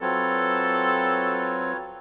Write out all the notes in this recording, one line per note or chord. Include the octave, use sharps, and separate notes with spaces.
F#3 C4 F4 A4 B4 C#5